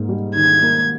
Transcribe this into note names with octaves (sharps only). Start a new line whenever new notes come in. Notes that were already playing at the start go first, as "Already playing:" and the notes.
Already playing: G#2 A#3
G3
D#3 G#6
A#3